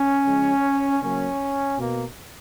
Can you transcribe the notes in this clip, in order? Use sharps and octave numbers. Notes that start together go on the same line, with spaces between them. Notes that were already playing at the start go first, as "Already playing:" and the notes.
Already playing: C#4
C#3 F3 G#3
C#3 F#3 A#3 C#4
B2 A#3